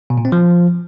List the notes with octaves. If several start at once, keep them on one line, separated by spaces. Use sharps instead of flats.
B2
A#2
C4
F3